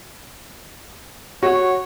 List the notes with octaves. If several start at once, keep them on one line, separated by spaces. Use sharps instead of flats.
F#4 C#5 F#5